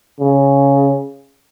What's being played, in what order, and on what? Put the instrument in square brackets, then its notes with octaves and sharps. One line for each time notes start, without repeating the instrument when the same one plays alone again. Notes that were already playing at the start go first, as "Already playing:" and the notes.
[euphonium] C#3